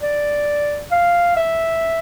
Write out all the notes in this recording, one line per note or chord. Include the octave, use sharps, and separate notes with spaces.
D5
F5
E5